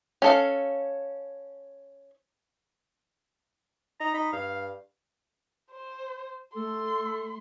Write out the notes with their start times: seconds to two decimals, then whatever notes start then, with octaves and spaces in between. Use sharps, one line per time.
0.22 C#4 A4 F5
4.00 D#4 A#5
4.14 D#4 B5
4.33 G2 F5
5.72 C5
6.56 A3 A4 C6